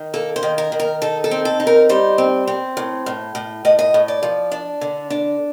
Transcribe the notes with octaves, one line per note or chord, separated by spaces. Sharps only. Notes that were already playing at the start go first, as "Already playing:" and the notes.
Already playing: D#3
A#3 A4
C5
D#3
A#4
D#3
A#4
D#4 A4
A4
C4
A4
D#4
A#4
G3 C5
C4
C4
A2
A2
A2
A2 D#5
D#5
A2
D5
F3
D4
D3
D4